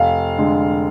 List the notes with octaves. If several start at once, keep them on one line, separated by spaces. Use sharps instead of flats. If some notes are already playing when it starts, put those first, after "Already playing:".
Already playing: F1 F5
D3 G#3